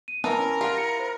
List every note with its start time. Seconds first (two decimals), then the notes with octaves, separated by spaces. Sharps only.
0.08 D#7
0.24 E3 B3 A#4 A5
0.39 C#4
0.61 F4 G4 F5 F#5
0.78 E4 C#7
0.99 C5